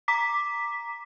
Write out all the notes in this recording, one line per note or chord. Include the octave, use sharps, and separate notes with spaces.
A#5 D6 B6